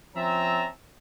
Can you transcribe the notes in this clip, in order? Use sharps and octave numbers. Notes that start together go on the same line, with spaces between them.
F3 C4 C#4 E5 A5 A#5